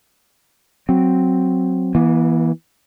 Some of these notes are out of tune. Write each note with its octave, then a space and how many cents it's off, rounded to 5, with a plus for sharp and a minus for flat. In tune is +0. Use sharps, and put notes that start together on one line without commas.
F#3 +0 C4 +0
E3 +0 B3 -45